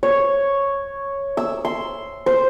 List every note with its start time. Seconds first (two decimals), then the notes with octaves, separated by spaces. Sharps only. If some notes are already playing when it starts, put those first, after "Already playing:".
0.03 C#5
1.37 E6
1.65 C6
2.26 C5